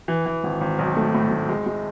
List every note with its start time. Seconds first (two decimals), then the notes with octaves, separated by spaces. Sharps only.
0.08 E3
0.26 E3
0.44 G#1
0.61 G#1
0.79 B1
0.97 A3
1.14 A2
1.31 A2
1.49 G#3
1.66 G#3